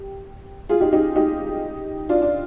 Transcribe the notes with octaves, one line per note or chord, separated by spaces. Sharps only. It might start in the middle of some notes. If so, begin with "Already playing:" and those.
Already playing: G4
F4 G#4
D#4 G4
D#4 G4
D#4 G4
D4 F4
D4